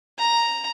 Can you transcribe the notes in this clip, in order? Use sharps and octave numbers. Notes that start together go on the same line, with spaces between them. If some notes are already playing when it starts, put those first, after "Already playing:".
A#5